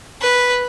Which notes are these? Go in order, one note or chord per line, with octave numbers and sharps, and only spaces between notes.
B4